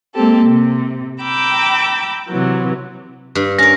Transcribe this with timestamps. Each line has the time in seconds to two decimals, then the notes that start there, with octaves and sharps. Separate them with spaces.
0.14 G#3 A#3 C4 G4 A4
0.46 C3
1.22 G5 A#5 B5 D6 E6
2.29 C3 E3 F#3
3.35 G2
3.59 C#4 A#4 A#6